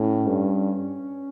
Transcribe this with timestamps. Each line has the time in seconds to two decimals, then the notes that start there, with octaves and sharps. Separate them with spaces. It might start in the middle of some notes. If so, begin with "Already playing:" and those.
Already playing: A2 C#4
0.27 G2